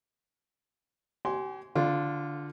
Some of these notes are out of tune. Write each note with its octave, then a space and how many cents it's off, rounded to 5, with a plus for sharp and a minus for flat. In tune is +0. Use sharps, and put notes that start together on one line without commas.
G4 -40 G#5 +0 C6 +0
D3 -10 F4 +0